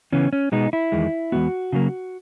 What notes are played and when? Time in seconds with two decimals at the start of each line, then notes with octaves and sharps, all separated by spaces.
0.13 C#3 E3 B3 C#4
0.33 C#4
0.52 B2 G#3 B3 D#4
0.73 E4
0.92 E2 D#3 G#3
1.32 E2 B2 G#3 B3 F#4
1.73 C#3 F#3 A#3